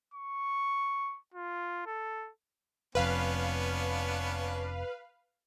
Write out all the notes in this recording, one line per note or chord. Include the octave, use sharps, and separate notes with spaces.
C#6
F4
A4
F1 F2 B3 C#4 D4 B4 F5